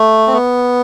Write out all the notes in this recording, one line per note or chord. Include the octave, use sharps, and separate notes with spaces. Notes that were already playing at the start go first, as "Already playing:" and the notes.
Already playing: A3
C4
B3